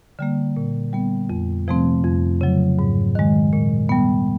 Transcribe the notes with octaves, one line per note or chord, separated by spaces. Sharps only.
D3 G3 A#3
A#2
G3 B3
F2
C3 F3 A3 C4
F2
C#3 F#3
G#2
D#3 G#3
A#2
G3 B3